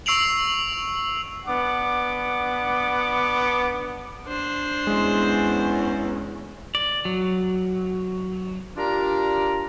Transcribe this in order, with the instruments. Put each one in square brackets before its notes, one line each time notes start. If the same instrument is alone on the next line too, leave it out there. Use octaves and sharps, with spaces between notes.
[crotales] C#6 E6 C7 D7 F7 F#7
[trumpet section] B3 D4 F#5 D6
[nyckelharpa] D4 C5
[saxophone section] E2 C#4 [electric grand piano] G#3
[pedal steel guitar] D5
F#3
[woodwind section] D4 F4 G4 A#4 D5 A#5